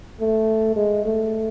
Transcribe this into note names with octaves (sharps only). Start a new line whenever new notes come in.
A3
G#3
A3